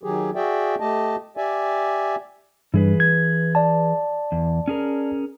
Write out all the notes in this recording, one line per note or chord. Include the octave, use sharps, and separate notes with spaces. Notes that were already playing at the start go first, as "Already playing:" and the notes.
D#3 F#3 G4 G#4
F#4 G#4 D5 E5 G5
A3 G4 D#5 A5
G4 D5 E5 G#5
G2 E3 G3 G#4 B4
G#6
D5 A5
E2
C#4 G#4 A#4